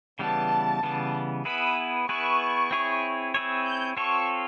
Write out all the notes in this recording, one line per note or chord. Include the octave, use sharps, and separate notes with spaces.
C#3 E3 G3 B3 A5
C#3 E3 G3 B3
B3 E4 G#4 B4 B5
B3 E4 G#4 B4 C#6
C4 E4 G#4 C#5
C4 E4 G#4 C#5
G6
C4 F4 A4 C#5 C#6